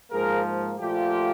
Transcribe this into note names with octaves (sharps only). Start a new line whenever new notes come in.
G#2 F3 A#3 G#4 A#4
A#2 F3 A3 F4 G4